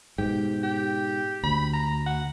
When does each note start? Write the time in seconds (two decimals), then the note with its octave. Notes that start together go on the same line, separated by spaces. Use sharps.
0.18 G#2 B2 G4
0.63 G4
1.43 D2 B5
1.74 A#5
2.06 F#5